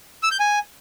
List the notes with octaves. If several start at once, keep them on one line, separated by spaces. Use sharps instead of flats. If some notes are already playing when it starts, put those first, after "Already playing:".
E6
G6
G#5